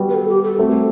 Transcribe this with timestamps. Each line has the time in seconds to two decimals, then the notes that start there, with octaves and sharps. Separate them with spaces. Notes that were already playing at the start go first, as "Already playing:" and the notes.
Already playing: G3 B3 F#4
0.09 B4
0.15 A4
0.29 G4
0.44 A4
0.58 A3 C4 F#4 A4